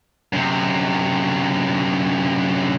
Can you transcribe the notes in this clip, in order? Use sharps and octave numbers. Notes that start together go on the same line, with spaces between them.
F#2 C3